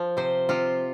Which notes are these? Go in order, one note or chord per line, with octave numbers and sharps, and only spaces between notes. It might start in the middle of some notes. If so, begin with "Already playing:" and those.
Already playing: F3
C3 C5
C3 F4